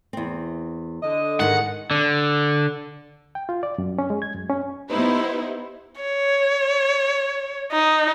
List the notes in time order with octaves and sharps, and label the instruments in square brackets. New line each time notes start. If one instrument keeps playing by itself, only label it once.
[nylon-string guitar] E2 C4
[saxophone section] D3 D#5
[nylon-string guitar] G#2 D#3 G#3 [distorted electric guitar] F#5
[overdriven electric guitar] D3
[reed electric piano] G5
F4
D5
F#2
C#4
G#3
G#6
F#2
C#4
[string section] B3 D#4 E4 G4 B4 C5
[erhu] C#5
D#4